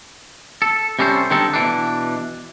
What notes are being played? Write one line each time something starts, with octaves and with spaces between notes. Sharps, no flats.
A4
C3 G3 C#4 A4 C5
D3 G3 C4 D#4 A4
B2 E3 D4